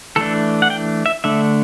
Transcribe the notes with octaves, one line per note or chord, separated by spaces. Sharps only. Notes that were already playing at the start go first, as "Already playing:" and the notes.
E3 A3 D4 A4
F#5
G5
E5
D3 A3 D4 E5